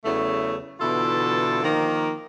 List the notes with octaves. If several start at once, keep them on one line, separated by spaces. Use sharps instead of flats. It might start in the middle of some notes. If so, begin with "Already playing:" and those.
E2 C#3 E3 F#3 A3
B2 D3 E3 E4 F4 A4
D#3 F3 A#3